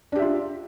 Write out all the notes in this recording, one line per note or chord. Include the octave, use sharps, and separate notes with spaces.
D4 F4 G4 E5